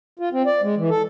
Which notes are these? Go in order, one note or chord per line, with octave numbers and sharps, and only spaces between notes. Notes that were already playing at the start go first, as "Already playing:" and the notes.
F4
C4
D5
G#3
E3
A4